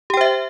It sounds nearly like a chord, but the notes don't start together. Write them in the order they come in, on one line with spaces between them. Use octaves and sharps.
G4 G5 C5 E5